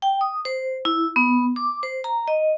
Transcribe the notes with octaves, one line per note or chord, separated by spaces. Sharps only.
G5
D#6
C5
E4
B3
D6
C5
A#5
D#5